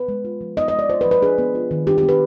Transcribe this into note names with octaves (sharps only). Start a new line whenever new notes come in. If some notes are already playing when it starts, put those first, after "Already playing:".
Already playing: B3 B4
G#3
F4
F3
B3 D#5
D#5
G#3
D5
F4 C5
B4
F3
B4
D4 G#4
B3
F4
D#3
D4 G4
G4
B3
B4